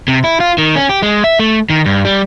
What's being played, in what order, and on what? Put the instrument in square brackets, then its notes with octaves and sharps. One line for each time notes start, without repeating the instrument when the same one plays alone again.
[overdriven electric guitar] C3
E4
F4
D#3
C#4
G4
G#3
E5
A3
D#3
G2
G3